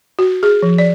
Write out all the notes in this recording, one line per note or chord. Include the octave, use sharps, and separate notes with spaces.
F#4
G#4
F3
D5